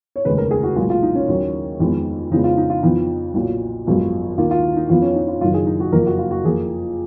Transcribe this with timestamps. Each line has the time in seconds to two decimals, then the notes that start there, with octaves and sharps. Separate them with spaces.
0.16 C#5
0.25 F1 D#2 C#3 G#3 B4
0.38 A#4
0.51 G#4
0.63 F#4
0.76 B1 A#2 G#3 F4
0.90 F4
1.02 D#4
1.15 C#4
1.28 D#2 D#3 F#3 A#3
1.80 F2 D#3 G#3 B3
2.31 F2 C#3 F3 G#3 B3 D#4
2.44 F4
2.57 D#4
2.70 F4
2.82 F2 F3 B3 D#4
3.34 B1 A#2 F#3
3.86 G#1 F#2 F3 G#3 B3
4.37 D#2 D#3 A#3 F4
4.51 F4
4.76 D#4
4.89 F2 F3 B3 F4
5.02 C#4
5.15 D#4
5.28 F4
5.41 F#1 F#2 D#3 F4
5.54 G#4
5.66 D#4
5.80 F#4
5.92 F#1 F2 F3 A#3 A#4
6.06 F#4
6.19 F4
6.31 F#4
6.44 F2 F3 A#3 G#4